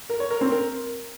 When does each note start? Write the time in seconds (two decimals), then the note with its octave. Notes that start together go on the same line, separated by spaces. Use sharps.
0.09 A#4
0.20 C#5
0.31 A#4
0.41 C4
0.52 A#4